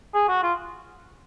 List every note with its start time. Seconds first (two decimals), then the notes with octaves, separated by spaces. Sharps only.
0.14 G#4
0.28 F#4
0.43 F4